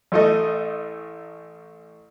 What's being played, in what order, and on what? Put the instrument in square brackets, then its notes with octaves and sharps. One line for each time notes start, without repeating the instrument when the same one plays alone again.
[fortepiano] A1 A3 D#5